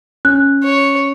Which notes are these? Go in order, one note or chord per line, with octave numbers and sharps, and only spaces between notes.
C#4 F#6
C#5